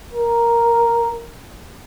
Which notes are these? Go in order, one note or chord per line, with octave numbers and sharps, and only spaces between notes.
A#4